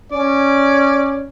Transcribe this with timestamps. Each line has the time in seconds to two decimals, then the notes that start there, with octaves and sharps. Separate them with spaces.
0.12 C#4 D5